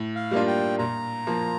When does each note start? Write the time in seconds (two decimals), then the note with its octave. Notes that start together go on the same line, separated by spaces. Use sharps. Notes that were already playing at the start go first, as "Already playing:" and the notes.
Already playing: A2
0.16 F5
0.31 G3 A#3 D4 F4
0.47 G5
0.79 A#2 A#5
1.27 F3 A#3